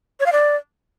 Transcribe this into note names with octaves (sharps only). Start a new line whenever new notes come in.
C#5
F5
D5